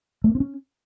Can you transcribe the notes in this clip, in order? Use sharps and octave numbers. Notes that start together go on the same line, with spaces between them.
A3
A#3
C4
C#4